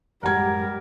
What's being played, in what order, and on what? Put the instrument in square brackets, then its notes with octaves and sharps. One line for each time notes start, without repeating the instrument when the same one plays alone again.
[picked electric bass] A1 F#2 G#3 [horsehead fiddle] G3 G4 [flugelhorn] A#4 [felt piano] F#5 G#6